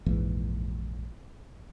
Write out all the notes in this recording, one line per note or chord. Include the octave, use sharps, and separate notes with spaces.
A#1 F2 G#2 E3